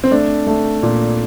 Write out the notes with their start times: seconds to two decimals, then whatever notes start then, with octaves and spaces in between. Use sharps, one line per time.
0.04 C4
0.11 A3 D4
0.47 A3
0.83 A#2